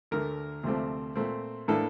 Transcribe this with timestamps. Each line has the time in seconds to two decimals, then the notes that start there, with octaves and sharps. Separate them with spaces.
0.11 D2 D3 A3 A#4
0.63 D2 C3 F3 A3 C4
1.16 A#2 A3 C4
1.68 A2 E3 A#3 D4 A4